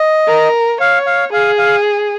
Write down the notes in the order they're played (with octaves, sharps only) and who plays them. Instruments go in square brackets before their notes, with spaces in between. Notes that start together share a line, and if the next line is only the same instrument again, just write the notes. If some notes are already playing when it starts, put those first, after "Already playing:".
Already playing: [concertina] D#5
[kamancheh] A#4
[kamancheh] C#5 [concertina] F5
[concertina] F5
[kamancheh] G#4 [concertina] F5
[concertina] F5